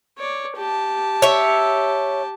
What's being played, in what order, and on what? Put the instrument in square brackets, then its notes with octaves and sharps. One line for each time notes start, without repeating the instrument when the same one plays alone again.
[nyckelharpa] C#5 D5
G4 A5
[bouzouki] C#5 E5